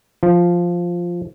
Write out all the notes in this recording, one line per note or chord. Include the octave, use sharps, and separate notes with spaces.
F3